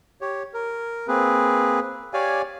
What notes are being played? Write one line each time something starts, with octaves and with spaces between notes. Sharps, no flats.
G4 C#5
A#4
A#3 C4 G#4 B4
G4 C#5 D5 F5 G#5